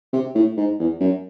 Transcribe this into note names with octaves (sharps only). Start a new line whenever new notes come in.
C3
A2
G#2
E2
F#2